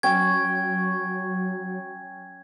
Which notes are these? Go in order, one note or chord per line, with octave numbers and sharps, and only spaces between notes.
F#3 C#4 G5 G#6